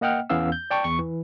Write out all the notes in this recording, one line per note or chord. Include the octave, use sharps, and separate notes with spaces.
A#3 D#5 F#5 G5 F6
E2 E3 B3 C#4 F5 E6
G6
D5 G5 A5 C#6
E2 C#6
E3